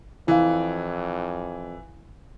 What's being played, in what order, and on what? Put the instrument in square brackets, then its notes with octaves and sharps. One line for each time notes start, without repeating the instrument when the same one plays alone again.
[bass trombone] F2 [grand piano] E3 [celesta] E4 F5